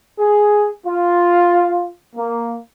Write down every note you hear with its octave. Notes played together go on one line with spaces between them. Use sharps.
G#4
F4
A#3